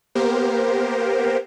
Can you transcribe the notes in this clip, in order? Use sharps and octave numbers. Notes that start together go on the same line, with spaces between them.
A#3 B3 G4 A#4 C5